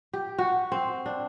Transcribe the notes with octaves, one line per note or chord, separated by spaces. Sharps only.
G4
F#4
C4
D4